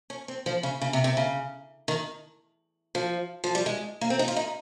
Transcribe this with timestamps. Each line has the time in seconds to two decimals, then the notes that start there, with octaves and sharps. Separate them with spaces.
0.10 C#4
0.28 C4
0.46 F3
0.63 C#3
0.81 C#3
0.93 C3
1.04 C3
1.17 C#3
1.88 D#3
2.95 F3
3.44 F3
3.55 G3
3.66 G#3
4.01 A#3
4.10 C4
4.19 D#4
4.28 F4
4.36 D#4